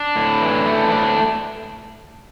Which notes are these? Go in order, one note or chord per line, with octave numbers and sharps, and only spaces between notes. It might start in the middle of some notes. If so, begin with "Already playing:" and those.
Already playing: D4
A2
E3
A3
A2 D4